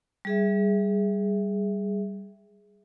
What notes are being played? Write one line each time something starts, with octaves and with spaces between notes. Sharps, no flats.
G3 G#4 E5